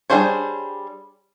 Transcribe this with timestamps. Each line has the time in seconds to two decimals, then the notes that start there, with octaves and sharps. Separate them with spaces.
0.10 G3 D4 G#4 C5 C#5